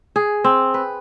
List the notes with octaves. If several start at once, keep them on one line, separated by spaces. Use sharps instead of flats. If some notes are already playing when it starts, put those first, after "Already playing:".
G#4
C4
B4